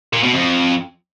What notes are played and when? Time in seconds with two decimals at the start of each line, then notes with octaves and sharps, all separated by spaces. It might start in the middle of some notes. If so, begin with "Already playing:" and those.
0.13 A#2
0.23 B2
0.34 F2